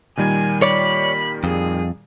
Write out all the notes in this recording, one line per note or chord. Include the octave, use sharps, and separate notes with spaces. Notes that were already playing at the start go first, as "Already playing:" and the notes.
A#2 D#3 G3 G#5
C#5 D5 B5
F2 G#4